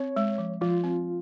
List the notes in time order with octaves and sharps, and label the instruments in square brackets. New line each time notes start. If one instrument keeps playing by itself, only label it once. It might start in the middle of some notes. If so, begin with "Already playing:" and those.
Already playing: [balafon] C4 [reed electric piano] C#5
[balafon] G#3
F3
[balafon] F3 [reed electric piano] F4
[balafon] C4